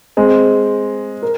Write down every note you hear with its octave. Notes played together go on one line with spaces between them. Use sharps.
G#3 C4
A#4